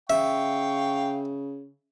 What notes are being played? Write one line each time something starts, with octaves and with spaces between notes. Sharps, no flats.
C#3 E5 F5 G5 C#6